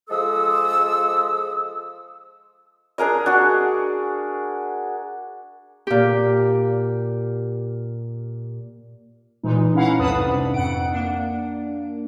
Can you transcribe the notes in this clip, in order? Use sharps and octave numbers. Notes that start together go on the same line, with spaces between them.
F3 G#3 A4 D#6 E6
D4 G#4 A#4 D#5
D4 F#4 G#4
A#2 G4
A#2 E3 G#3 D#4
C#4 E4 F5 F#5 A#5
C2 F2 B4 A5 B5 D#6
G#2 C3 D4
F2 F#5 D7
A#3 D4